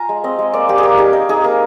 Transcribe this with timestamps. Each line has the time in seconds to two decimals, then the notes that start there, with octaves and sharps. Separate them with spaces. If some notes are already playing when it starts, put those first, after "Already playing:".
Already playing: F4 F5 G#5 A#5
0.09 G#3
0.24 C4 D#5
0.39 G#3
0.53 A#3 D5
0.69 A#3 G4
0.78 G#4
0.83 A#3 G4
0.98 D#4 G#4
1.13 D#4 A#4
1.29 D#4 G#4
1.44 A#3